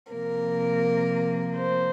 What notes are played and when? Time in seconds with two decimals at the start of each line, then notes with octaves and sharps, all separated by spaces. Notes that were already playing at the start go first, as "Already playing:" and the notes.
0.12 C3 F3 A#3 A#4
1.56 C5